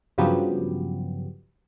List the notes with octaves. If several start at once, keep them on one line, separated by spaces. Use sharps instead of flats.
G2 C#3 F3 F#3 B3 G4